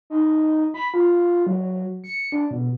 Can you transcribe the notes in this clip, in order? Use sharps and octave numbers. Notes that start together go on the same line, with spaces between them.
D#4
B5
F4
F#3
C#7
D4
B2